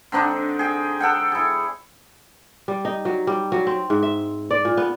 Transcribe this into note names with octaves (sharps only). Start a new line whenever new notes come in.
D3 C4 D4 D#4
G#4 G5
A4 F#5 G5
E4 G#4
G3
D#4
F#3
G3
F#3
C4
G#2
E5
D5
A#2
B3